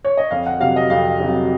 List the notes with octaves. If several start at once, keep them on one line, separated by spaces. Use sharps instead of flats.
C#5
D#5
F2 F5
F#5
C3 F#3 F5
D#5
F2 F5
C3 F#3